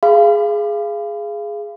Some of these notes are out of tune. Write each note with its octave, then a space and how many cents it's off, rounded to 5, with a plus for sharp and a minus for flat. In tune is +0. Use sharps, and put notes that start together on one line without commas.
G#4 +5 F5 -25 B5 +30